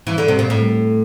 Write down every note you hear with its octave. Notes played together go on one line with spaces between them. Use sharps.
E3
D3
C3
A#2
A2